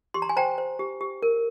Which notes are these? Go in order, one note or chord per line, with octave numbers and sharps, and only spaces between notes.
G4 C6
A#5
G#5
C5 G5 A#5
C5
G4
G4
A#4